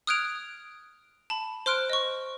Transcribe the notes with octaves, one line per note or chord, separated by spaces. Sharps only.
D#6 F6 F#6 G#6 D7 F7
A5 B5
C5 C6 F6 F#6 D7
D#5 C#6